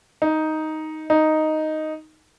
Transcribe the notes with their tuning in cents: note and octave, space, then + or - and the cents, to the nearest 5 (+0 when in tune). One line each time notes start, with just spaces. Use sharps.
D#4 +5
D#4 +0